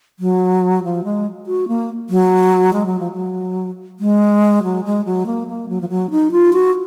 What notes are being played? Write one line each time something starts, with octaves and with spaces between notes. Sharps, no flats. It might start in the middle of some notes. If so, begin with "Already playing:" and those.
F#3
F3
G#3
F#4
A#3
F#3
G#3
F#3
F3
F#3
G#3
F#3
G#3
F#3
A#3
A#3
F#3
F3
F#3
D#4
F4
F#4